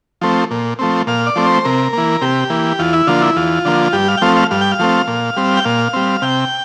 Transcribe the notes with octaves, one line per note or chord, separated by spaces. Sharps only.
F3 A3 C4
A#2
F3 A3 C4
A#2 F5
D5
F3 A3 C4
C5
C3 A#4
E3 A#3
C3 G4
E3 A#3
E2 F4
E4
D3 F3 A#3 F4
E4
E2 F4
D3 F3 A#3
G2 G4
F5
G5
F3 A3 C4 F5
F5
G2 F5
G5
F5
F3 A3 C4
A#2
G3 C4
G5
A#2 F5
G3 C4
C3 G5